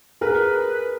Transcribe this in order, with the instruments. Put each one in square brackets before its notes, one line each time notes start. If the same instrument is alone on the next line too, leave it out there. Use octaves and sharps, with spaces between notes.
[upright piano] G#4 A#4 [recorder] B4